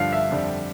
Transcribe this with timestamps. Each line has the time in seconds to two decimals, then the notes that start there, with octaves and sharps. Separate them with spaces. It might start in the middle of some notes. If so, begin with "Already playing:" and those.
Already playing: G2 D3 F3 F5
0.12 E5
0.30 F2 D3 G3